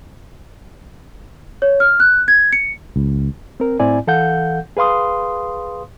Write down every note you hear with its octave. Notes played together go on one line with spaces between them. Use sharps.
C#5
F6
F#6
G#6
C#7
C#2
C4 A#4
A2 C4 E4 D5 G#5
E3 A4 F5 F#5 G6
G#4 B4 F5 C6 D#6